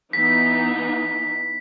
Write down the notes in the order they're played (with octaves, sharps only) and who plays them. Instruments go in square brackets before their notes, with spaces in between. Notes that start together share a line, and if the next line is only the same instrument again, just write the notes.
[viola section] E3 B3 D#4 [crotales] B6